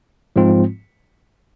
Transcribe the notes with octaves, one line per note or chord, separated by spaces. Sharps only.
G#2 F3 G#3 C4 F4